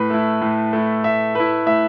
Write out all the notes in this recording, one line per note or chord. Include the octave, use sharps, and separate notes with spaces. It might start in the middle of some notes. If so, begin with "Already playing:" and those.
Already playing: A2 B4
A3 E4
A2
A3 E4
A2 E5
A3 E4 B4
A2 E5